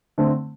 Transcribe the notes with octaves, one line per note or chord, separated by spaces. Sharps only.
D3 A3 C4